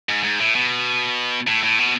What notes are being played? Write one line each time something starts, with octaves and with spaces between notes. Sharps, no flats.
G#2
G#2
A2
B2
A2
A2
B2